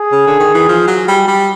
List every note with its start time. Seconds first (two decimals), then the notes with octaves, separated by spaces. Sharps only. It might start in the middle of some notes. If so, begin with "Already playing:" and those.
Already playing: G#4
0.12 C#3
0.27 D3
0.40 D#3
0.54 E3
0.68 F3
0.88 F#3
1.08 G3
1.28 G3